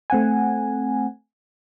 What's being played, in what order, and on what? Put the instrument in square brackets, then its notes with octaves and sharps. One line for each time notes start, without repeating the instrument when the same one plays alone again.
[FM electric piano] A3 C4 F#5 G#5